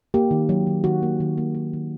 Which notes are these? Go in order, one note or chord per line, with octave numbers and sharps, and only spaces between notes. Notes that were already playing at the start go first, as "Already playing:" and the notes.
A#3 G4
D#3
F#3
D#3
D#3 F#4
A#3
D#3
A#3
A#3
D#3